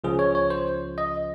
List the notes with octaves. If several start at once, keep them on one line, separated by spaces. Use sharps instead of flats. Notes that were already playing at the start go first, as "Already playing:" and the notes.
C#2 C#3 F3 G#4
C#5
C#5
C5
D#5